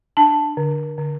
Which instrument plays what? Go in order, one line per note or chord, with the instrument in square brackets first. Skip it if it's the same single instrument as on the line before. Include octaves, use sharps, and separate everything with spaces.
[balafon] D4 A5
D3
D3